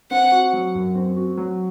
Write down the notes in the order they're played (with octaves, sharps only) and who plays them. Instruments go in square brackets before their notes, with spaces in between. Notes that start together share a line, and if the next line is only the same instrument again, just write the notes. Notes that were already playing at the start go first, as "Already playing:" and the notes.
[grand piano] C4 [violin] F#5
[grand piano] F#4
F#3
F#2
C4
F#4
F#3